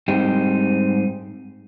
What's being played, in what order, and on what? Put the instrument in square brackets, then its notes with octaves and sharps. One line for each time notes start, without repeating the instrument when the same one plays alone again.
[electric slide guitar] G#2 G3 C4 D#4 G4